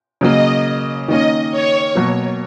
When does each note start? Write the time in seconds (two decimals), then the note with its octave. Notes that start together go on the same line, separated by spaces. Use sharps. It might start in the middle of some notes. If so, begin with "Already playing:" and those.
0.21 C#3 F#3 A#3 D#5
1.08 D#3 A#3 C#4 D#5
1.52 C#5
1.95 B2 F#3 A#3